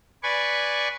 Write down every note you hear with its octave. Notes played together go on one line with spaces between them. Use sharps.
B4 D5 G#5 C#6